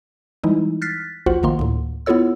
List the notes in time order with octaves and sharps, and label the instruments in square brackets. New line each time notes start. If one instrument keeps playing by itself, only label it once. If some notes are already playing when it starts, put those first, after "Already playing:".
[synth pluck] E3 G3 G#3 D#4 E4
F6 F#6 A6 B6 C7
A#1 D#2 F4 F#4 C5 F#5
A#1 D#3 A#3 C6
D2 A2
B3 E4 F4 A4 C#5 E6